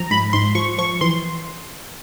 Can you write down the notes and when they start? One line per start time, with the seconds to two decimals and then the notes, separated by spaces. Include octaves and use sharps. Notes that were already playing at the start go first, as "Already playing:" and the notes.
Already playing: F3 A#5
0.11 G#2 B5
0.33 G#2 C6
0.55 F3 C#6
0.78 F3 C#6
1.01 E3 C6